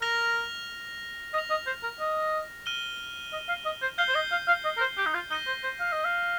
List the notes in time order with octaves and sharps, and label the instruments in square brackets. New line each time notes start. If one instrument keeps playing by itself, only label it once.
[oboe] A#4 [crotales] F6 A#6 F7
[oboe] D#5 [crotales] A#6 F7
[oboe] D#5
C5
A#4
D#5
[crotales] F6 D#7 G7
[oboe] D#5
F5
D#5
C5
[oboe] F5 [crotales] G6 C7 G7
[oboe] C5
D#5
F5
F5
D#5
A#4
C5
G4
D#4
F4
[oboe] D#4 [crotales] A#6 D#7 G7
[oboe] C5
C5
F5
D#5
F5